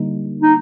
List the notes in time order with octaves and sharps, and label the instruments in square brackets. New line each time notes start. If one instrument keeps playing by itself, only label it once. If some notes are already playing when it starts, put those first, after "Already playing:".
Already playing: [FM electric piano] D3 G3 A#3 D#4
[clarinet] D#4